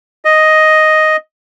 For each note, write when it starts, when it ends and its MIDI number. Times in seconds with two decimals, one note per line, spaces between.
0.25 1.17 75